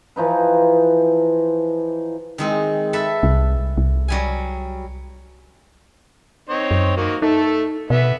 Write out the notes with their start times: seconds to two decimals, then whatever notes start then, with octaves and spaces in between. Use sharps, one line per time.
0.16 E3 F3 D#4 B4
2.38 D#3 G#3 C4
2.93 A4 B4 E5
3.23 C2
3.78 C2
4.08 F#3 G3 G#5
6.49 C4 D#4 C#5
6.71 F#2
6.97 D#3 A#3 F#4
7.22 A3 D#4 A4
7.90 B2 B3 E5